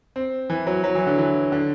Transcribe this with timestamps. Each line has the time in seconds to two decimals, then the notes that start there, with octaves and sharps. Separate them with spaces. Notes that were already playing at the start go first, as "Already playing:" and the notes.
0.16 C4
0.50 E3
0.67 F#3
0.84 F#3
0.95 E3
1.07 D3
1.18 E3
1.52 D3